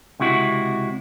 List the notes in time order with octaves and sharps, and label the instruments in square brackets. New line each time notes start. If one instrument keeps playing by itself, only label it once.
[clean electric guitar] C#2 C3 E4 F#4